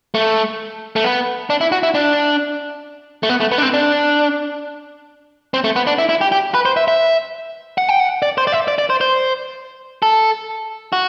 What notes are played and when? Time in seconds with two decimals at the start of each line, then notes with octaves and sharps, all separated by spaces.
0.15 A3
0.96 A3
1.04 B3
1.50 D4
1.61 E4
1.72 F#4
1.83 E4
1.94 D4
3.23 A3
3.29 B3
3.40 A3
3.52 B3
3.58 D4
3.63 C4
3.74 D4
5.54 C4
5.64 A3
5.76 B3
5.87 D4
5.98 E4
6.09 E4
6.21 G4
6.32 G4
6.54 B4
6.65 C5
6.77 E5
6.88 E5
7.78 F#5
7.89 G5
8.00 F#5
8.22 D5
8.38 C5
8.47 D5
8.52 E5
8.68 D5
8.78 D5
8.90 C5
9.01 C5
10.02 A4
10.93 F#4